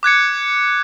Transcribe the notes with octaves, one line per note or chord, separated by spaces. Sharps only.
D6 F#6 G#6 C#7